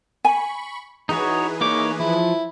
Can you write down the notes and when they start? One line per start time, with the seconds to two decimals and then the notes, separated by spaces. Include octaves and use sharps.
0.25 G#5 B5 C#6
1.09 E3 D#4 F#4 G#4 B4 C#5
1.61 A#3 D#4 C#5 D6
1.99 F3 E4